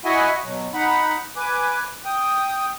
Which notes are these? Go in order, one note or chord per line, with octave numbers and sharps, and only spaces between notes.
E4 F#4 D#5 E5 F#5 G#5
B2 F#3
D#4 F#5 B5
B4 G#5 D6
G5 D#6